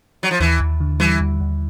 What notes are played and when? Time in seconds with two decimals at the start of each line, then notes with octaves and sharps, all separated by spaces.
0.23 F#3
0.31 F3
0.40 D#2 E3
0.60 D#2
0.80 D3
1.00 E3 G3
1.20 D#2
1.41 D#2